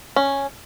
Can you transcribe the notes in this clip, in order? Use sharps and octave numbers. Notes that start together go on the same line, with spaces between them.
C#4